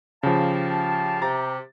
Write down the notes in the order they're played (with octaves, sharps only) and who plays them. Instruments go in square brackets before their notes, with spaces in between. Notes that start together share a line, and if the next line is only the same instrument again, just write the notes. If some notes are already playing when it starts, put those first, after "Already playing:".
[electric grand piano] C#3 F3 [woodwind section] G4 F5 A5
[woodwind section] C3 G4 [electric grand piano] A#5 A6